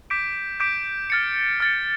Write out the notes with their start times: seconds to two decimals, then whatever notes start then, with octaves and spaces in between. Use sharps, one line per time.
0.10 D6 G6 B6 D7
0.60 D6 G6 B6 D7
1.10 F6 A6 C#7
1.60 F6 A6 C#7